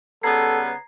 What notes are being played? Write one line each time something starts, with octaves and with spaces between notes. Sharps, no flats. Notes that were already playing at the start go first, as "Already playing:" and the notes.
C#3 G3 B3 A4 A#5 G#6 C7